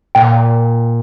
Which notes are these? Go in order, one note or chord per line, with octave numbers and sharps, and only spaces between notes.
A#2 G5